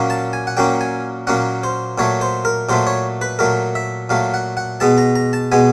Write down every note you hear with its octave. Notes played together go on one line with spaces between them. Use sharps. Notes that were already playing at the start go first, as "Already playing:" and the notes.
Already playing: A#2 F#3 A#3 C#4
A5
G#5
F#5
A#2 F#3 A#3 C#4 G5
G#5
A#2 F#3 A#3 C#4 F#5
C5
A#2 F#3 A3 C#5
C5
A#4
A#2 F#3 A3 C5
C#5
B4
A#2 F#3 A3 A#4
E5
A#2 F#3 A3 F5
F#5
F#5
B2 G#3 B3 A5
A#5
A#5
A5
B2 G#3 B3 G#5